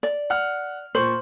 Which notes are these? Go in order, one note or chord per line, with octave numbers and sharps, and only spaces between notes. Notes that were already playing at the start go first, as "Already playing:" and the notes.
D5
F#5 F6
A#2 C5 C#6 F#7